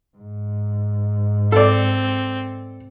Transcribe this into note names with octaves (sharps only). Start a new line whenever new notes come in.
G#2
C4 A4 D5